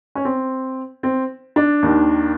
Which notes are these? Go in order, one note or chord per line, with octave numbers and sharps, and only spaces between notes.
C#4
C4
C4
D4
D#2 D#3